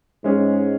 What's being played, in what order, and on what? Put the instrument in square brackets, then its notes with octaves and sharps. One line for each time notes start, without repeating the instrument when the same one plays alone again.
[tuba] G#2 [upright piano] G#3 C#4 G#4